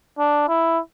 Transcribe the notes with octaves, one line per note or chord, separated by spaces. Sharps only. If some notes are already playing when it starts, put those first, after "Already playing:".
D4
E4